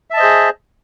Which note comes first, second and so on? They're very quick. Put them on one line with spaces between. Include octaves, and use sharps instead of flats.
E5 A5 D#5 C5 G#4